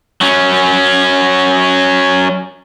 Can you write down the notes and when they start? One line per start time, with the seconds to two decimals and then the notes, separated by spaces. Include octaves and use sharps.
0.21 F#3 C#4